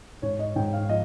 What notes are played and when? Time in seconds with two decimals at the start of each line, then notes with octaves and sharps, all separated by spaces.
0.22 G#2 C#5
0.39 D#5
0.56 G#2 G5
0.73 F5
0.89 F3 D#5